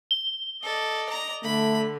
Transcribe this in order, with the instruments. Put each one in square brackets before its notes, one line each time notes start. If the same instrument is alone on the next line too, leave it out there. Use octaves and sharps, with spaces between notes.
[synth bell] G7
[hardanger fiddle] A4 [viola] D5 D#5
[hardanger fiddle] A#5
[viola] D3 [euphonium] A3 [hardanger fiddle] B5